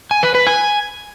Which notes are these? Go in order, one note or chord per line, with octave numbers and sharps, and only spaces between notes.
G#5
B4
B4
G#5